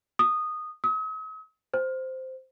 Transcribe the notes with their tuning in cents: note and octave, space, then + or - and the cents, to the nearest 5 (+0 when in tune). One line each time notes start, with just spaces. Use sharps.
D#6 -10
D#6 +45
C5 -5